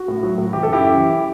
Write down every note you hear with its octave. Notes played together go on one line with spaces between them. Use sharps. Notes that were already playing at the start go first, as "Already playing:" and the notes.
Already playing: F#4
A2
F#3
A2
E3 G4
F#2 A4
E4 G4
F#2
E3